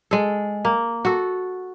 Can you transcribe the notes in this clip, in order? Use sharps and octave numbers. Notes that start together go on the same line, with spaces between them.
G#3 A4
A#3
F#4 A4